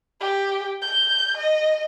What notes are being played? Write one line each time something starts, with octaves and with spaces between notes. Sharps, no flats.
G4
G6
D#5